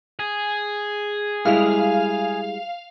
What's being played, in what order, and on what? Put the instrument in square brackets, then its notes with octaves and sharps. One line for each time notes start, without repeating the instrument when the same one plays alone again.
[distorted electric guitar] G#4
[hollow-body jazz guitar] G3 G#3 E4 [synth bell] F5 F7